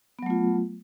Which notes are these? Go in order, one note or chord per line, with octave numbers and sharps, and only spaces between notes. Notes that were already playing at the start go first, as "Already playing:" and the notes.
F#3 A3 B3 F4